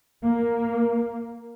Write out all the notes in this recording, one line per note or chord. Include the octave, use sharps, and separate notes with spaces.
A#3